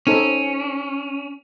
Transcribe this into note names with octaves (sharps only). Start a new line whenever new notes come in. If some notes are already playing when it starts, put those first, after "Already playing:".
C4 C#4 D#4 A4